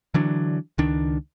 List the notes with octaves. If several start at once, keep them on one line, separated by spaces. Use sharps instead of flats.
D3 E3 F#3 D4
C#2 D#3 D4